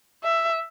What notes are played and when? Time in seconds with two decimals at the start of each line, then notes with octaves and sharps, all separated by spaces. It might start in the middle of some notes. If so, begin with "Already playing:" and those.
0.23 E5